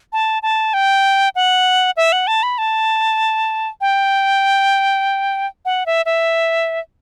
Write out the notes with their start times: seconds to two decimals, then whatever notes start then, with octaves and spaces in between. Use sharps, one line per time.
0.13 A5
0.43 A5
0.74 G5
1.35 F#5
1.97 E5
2.12 F#5
2.27 A5
2.43 B5
2.58 A5
3.81 G5
5.65 F#5
5.86 E5
6.06 E5